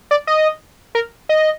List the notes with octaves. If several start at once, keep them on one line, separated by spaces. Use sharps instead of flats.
D5
D#5
A#4
D#5